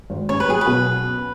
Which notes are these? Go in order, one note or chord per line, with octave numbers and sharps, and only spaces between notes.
G#1
C#4 C#5
B4
F#3 G#4
B4
B2